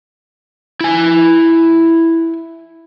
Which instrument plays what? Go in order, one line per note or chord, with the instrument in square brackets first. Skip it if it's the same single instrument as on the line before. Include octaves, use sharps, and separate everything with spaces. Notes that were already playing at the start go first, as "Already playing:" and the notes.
[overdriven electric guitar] E4 G#5